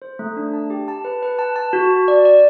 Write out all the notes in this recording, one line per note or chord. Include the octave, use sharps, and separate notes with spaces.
C5
A3
D4
A5
G4
A5
B4
B4
A5
A5
F#4
F#4
D5
D5